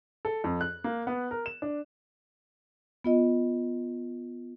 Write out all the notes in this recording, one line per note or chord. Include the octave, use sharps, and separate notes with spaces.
A4
F2
F#6
A#3
B3
A#4
E7
D4
B3 F4 D#5